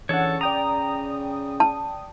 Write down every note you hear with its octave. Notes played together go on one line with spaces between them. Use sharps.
C#3 E3 D4 A4 C#5 F#5
D5 G5 A#5 D#6
A5